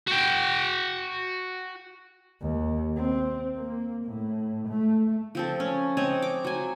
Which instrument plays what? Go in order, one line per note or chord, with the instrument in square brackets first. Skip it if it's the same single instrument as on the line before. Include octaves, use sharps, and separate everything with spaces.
[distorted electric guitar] F#4 G5
[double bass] D#2
C4
A#3
A2
A3
[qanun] F3 C4 A4
C#4
C4 C#5 D#5
D6
F#3 G#5